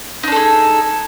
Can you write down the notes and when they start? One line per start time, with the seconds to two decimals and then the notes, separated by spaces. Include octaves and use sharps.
0.23 D#4
0.28 D4
0.32 A4
0.36 G#4